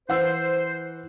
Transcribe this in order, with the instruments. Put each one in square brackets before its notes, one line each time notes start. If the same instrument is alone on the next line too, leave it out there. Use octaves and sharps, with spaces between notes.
[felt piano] E3 F#5 E6 [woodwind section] C5